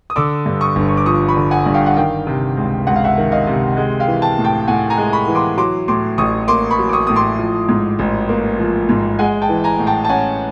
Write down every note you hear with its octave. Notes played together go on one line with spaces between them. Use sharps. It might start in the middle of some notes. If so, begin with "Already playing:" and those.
D#6
D3 D6 E6
G2
C#6 D#6
G1
C#6
D6
F3 C#6 D#6
B5 C#6
D3
F#5 G#5
G2
F5 G5
F#5
D#3 F5 G5
C3
C#2
C#2 F#5
F5
E5 F#5
D#3
D#5 F5
C3
G#3
F5 G5
E3
G5 A5
A2
G5 A5
A2 F#5 G#5
G#5 A#5
G#3
B5 C#6
E3
C6 D6
F#3 C6 D6
A2 C6 D6
A1 C#6 D#6
A#3 C6 D6
B5 C#6
F#3
D6
C#6 D#6
A2 D#6
C6 D6
F3
G#2
A1
A#3
F3
G#2
G#3 F#5 G#5
G5 A5
E3
G#5 A#5
A2
G5 A5
A5
C#4 F#5 G#5